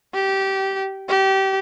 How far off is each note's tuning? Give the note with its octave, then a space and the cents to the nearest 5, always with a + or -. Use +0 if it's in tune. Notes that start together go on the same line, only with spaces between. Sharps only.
G4 -20
G4 -25